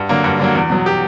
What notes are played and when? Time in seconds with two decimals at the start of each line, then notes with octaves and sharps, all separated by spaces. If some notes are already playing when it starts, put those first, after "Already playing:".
Already playing: G2 F#4
0.09 D3 F#3 A#3
0.24 G2
0.39 D3 F#3 A#3
0.55 E2
0.70 B2 F#3
0.86 G4